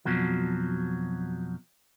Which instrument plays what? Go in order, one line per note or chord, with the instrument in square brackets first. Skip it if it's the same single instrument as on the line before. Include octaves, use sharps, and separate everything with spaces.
[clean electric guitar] F2 B2 F3 F#3